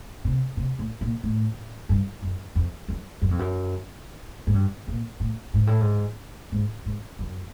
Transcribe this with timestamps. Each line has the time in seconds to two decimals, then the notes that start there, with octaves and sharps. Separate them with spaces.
0.25 C3
0.57 C3
0.79 A2
1.01 A#2
1.23 A2
1.89 G2
2.23 F#2
2.55 F2
2.88 F#2
3.22 F#2
3.31 F2
3.39 F#2
4.47 G#2
4.54 G2
4.88 A#2
5.20 A2
5.54 G#2
5.67 A2
5.81 G#2
6.52 G#2
6.86 G#2
7.19 F#2